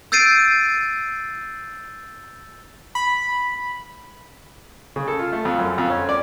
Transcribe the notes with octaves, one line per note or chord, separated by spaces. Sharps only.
E6 G6 A6 C7 D7 D#7
B5
C#3
A4
F4
A3
F2
F#2
F2
C#4
D5